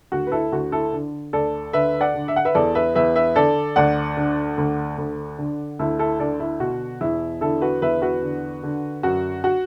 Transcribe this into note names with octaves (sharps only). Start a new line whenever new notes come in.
D2 F#4
B4
E4 A4
D2 F#4
E4 A4
D3
D2 A4 D5
D3 B4 E5
D5 F#5
D3
E5
F#5
B4 E5
E2 A4 D5
B4 E5
E2 B4 E5
B4 E5
D3 A4 D5
D2 D5 F#5
D3
D2
D2
D3
D2 E4 A4
E4 A4
D3 A4 D5
E4
B2 F#4
E2 E4
D3 E4 A4
F#4 B4
E2 B4 E5
F#4 B4
D3
D3
F#2 F#4
F#4